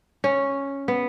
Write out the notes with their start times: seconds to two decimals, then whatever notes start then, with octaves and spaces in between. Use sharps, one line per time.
0.24 C#4
0.88 B3